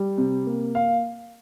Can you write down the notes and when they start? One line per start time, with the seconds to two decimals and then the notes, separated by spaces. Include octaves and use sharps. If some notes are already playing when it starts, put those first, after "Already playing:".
Already playing: G3
0.18 C3
0.47 A#3
0.75 F5